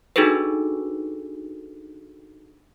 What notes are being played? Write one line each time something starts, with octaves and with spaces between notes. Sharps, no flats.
D4 D#4 F#4 G#4 A4 B4